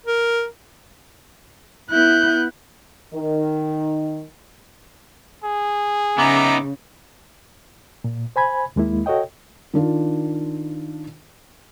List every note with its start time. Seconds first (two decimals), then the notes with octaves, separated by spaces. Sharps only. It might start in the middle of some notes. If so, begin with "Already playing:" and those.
0.06 A#4
1.90 B3 E4 F#6 G6
3.14 D#3
5.44 G#4
6.18 C#3 B3 D#4 E5 A#5 D6
8.04 A#2
8.36 C5 G#5 B5 G#6
8.76 D#2 G#3 A#3 E4
9.06 F#4 A4 C#5 D#5 G5
9.74 D#3 D4 F4